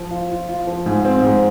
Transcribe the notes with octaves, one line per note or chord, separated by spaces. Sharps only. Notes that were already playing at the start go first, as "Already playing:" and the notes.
Already playing: F3 F4
F4
F4
F4
F3
G#2
C4
G#2